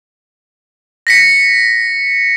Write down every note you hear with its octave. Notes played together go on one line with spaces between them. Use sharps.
A#6 B6 C#7